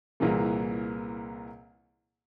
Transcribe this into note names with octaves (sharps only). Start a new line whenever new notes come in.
C2 A#2 C#3 E3 A#3